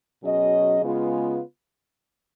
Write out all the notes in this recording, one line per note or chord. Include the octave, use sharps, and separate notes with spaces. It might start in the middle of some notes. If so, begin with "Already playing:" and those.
B2 F#3 C#4 G#4 D#5
C#3 G#3 B3 F4 B4